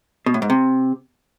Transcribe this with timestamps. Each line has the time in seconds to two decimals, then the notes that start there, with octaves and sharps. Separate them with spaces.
0.26 B2
0.34 A2
0.42 G#2
0.50 C3